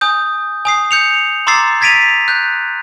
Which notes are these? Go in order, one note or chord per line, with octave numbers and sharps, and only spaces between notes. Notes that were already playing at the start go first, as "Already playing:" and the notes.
G#5 D#6 G6
G#5 D#6 C7
G6 C#7 F7
A#5 C6 D6 E6 A6 C7
G#6 A6 B6 D7 D#7 F7
F#6 G6